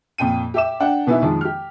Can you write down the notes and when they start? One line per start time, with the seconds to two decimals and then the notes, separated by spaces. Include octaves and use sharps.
0.18 F2 A#2 G5 D#7
0.54 G4 E5 D6 E7
0.80 D4 F#5 G5
1.07 B2 E3 B3 D#4 E4
1.22 F2 D#3 F3 G#3
1.41 G4 F6